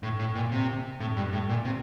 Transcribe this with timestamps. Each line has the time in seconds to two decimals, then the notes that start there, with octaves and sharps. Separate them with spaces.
0.03 A2
0.19 A2
0.35 A#2
0.52 C3
1.00 A2
1.16 G2
1.33 A2
1.49 A#2
1.65 C3